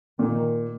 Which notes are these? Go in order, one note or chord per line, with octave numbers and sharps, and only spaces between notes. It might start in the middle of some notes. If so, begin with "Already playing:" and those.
A#2 D#3